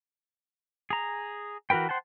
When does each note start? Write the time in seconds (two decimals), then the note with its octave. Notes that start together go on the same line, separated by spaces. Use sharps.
0.90 G#4 A#5
1.70 E3 F#4 A#4 B4 G5
1.89 C5 F#5 G5 A5